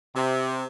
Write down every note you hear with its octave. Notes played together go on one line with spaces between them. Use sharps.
C3